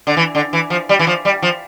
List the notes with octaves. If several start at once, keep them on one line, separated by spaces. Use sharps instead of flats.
D3
E3
D3
E3
F3
G3
E3
F3
G3
F3